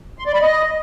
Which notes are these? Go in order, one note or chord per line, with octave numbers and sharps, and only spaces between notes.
C6
D5
B5
D#5